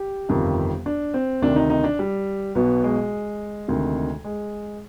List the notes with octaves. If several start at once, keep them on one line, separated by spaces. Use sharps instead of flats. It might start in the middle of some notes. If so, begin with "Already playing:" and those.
Already playing: G4
G1 F2 C3 D#3
D4
C4
D2 C3 D#3 D4
D#4
D#4
D4
G3
B1 B2 B3
G#3
D2 C3 D#3
G#3